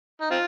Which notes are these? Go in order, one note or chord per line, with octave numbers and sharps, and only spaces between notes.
D#4
C4 F4